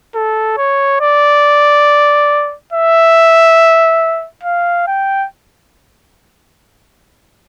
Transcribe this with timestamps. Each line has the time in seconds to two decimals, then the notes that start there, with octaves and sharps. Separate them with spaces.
0.15 A4
0.57 C#5
1.01 D5
2.73 E5
4.44 F5
4.87 G5